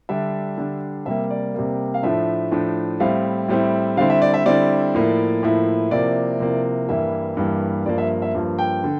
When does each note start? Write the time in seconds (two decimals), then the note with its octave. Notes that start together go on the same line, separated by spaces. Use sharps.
0.09 D3 G3 D4 E5
0.58 D3 G3 D4
1.06 C3 G3 A#3 E5
1.31 D5
1.54 C3 G3 A#3
1.94 F5
2.03 A2 F3 A3 D4 E5
2.52 A2 F3 A3 D4
3.00 A2 G3 C4 E4 F5
3.48 A2 G3 C4 E4
3.97 D3 G3 C4 E4 F5
4.10 E5
4.22 D5
4.34 E5
4.46 D3 G3 C4 E4 D5
4.95 A2 F3 A#3 E4
5.43 A2 F3 A#3 E4
5.91 C3 F3 A#3 E4 D5
6.40 C3 F3 A#3 E4
6.89 G2 E3 G3 A#3 E4 E5
7.37 G2 E3 G3 A#3 E4
7.86 G2 F3 A#3 D5
7.98 E5
8.22 E5
8.34 G2 F3 A#3
8.59 G5
8.84 D3